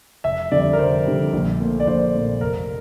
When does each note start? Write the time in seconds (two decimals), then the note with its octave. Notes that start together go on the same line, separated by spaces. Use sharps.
0.24 F1 E5
0.52 F2 D3 G3 D5
0.73 A#4
0.78 F1 C5
1.06 F2 D3 G3
1.33 A#1
1.60 A#2 A3
1.80 D5
1.87 A#1 C5
2.14 A#2 A3
2.41 F1 A#4